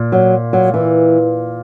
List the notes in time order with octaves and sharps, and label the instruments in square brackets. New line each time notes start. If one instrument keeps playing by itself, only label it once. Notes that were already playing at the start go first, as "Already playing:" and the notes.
Already playing: [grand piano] A#2
[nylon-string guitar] F#3
F#3
E3